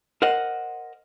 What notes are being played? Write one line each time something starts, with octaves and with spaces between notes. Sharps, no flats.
A#4 C5 D#5 F#5